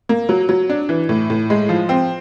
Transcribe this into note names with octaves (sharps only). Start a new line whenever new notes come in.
A#3
F#3
F#3
D4
E3
A2
A2
G#3
F3
C4